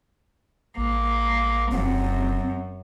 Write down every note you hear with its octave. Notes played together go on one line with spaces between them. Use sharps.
A1 A#3
F1 F#2 C4